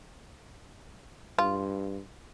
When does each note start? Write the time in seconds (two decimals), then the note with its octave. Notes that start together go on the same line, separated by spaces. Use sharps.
1.38 G2 F4